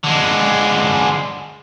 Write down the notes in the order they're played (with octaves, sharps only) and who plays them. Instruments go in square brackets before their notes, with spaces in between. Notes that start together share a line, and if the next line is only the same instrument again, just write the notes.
[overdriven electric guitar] D3 G#3